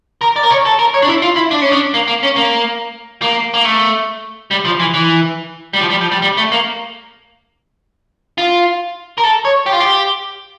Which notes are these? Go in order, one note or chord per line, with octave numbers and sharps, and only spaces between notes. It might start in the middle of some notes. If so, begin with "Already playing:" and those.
A#4
D5
A#4
C#5
A4
A#4
C#5
D4
E4
F4
E4
D4
C#4
D4
A#3
A#3
C#4
A#3
A#3
A#3
A3
G3
F3
E3
E3
G3
F3
G3
F3
G3
G3
A3
A#3
F4
A#4
A4
C#5
G4
F4
G4